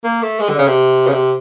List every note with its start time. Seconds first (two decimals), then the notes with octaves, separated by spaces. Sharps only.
0.04 A#3
0.22 A3
0.40 G#3
0.49 D3
0.58 C#3
0.67 C3
1.07 C#3
1.12 C3